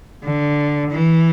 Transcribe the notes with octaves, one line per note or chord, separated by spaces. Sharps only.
D3
E3